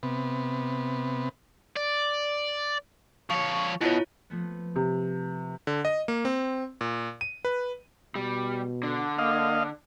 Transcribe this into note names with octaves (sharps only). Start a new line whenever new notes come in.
C3 B3
D5
F3 C#5 C#6
B2 E4 F4 C#5
F3 A3 B3
C3
D3
D#5
A#3
C4
A#2
D#7
B4
B2 G3
D3
A#3 D#5 F5